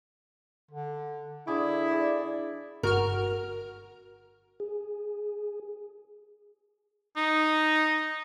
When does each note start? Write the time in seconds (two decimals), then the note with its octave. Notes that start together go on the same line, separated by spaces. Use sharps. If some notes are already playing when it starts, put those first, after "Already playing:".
0.71 D3
1.47 D3 E4 G#4 D6
1.91 G#4 D5
2.83 G1 F#4 A#4 F6
4.60 G#4
7.17 D#4